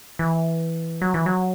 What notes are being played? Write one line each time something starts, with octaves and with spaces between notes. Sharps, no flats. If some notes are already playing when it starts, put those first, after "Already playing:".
E3
F#3
E3
F#3